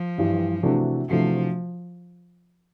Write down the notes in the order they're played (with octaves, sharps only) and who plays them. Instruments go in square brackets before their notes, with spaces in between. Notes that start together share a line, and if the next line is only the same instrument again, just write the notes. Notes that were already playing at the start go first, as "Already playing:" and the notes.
Already playing: [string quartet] F3
[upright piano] G2 E3 G3
C3 E3 A3 D4 F#4
[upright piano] C3 E3 A3 D4 F#4 [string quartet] F3